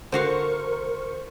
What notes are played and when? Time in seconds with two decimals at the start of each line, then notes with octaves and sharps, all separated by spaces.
0.12 D3 F#4 A#4 C5 F5 C#6